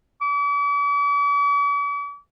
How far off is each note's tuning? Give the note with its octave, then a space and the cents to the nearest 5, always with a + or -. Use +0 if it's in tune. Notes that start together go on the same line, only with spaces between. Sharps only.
D6 -45